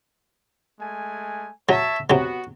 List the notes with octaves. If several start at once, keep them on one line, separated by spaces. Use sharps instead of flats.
G#3 A3 G#5
F#3 C#5 E5 A5
C3 F#3 B3 F#4